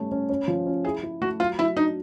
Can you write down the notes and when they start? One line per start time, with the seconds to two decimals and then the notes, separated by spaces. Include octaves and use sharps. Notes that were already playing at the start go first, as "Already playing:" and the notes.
Already playing: G3 A3 C#4
0.12 C#4
0.29 C#4
0.48 F3
0.66 C#4
0.85 E4 G#4
1.03 E4
1.21 A3 F#4
1.40 F#3 F4
1.59 F#3 E4
1.76 D4 D#4